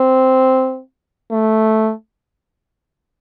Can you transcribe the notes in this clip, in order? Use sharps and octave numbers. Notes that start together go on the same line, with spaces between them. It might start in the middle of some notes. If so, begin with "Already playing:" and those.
Already playing: C4
A3